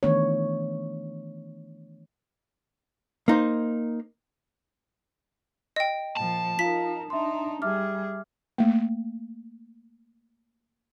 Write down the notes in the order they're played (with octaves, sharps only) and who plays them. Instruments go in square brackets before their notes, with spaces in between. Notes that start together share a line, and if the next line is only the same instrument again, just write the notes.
[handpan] D#3 E3 A3 B3 D4 C#5
[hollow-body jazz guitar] A#3 D#4 C5
[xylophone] D#5 G5
[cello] A#2 F3 [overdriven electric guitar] A5
[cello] D#4 A#4 [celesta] F4 F5 [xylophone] B6
[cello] D4 D#4 [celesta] E5 C6
[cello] G3 G#4 [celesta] E5 D6 F6
[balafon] A3 A#3